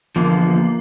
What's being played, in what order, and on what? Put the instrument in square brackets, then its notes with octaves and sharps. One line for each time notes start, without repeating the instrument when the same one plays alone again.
[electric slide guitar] E2 D3 F3 [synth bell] A#3